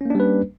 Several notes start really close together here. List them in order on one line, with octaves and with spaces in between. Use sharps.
C#4 A#3 D4 G3 B4